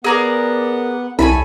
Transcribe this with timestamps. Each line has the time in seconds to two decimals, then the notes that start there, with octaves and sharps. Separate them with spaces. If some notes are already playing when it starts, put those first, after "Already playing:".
0.05 B3 G#4 A#4 D5 F#5
1.19 C2 A4 C#5 E5 G#5 A5 B5